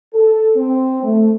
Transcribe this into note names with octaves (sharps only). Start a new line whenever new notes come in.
A4
C4
A3